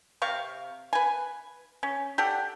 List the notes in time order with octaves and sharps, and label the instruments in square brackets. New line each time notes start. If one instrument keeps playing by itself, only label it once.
[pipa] C3 F5 C#6
B4 G#5
C#4
G4 A4 D5 F#5